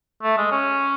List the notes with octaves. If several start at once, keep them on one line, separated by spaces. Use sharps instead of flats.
A3
G#3
C#4